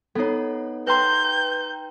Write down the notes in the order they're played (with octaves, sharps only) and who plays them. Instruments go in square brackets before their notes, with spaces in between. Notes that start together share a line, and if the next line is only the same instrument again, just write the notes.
[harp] B3 D#4 [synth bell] A4 C#5
[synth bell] B4 G5 A#5 [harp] C6 F#6 [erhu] G6